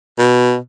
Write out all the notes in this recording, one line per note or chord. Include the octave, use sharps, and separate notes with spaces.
B2